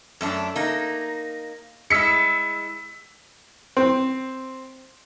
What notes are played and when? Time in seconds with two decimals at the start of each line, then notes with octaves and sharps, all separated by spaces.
0.21 F#2 A3 D4
0.56 A#3 D#4
1.90 G#3 E4 E6 B6 C#7
3.77 C4